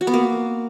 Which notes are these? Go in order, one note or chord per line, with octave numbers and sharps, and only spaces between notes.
F#4
B3
A#3